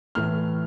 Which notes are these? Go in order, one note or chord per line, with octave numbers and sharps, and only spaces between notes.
A2 E3 A3 F6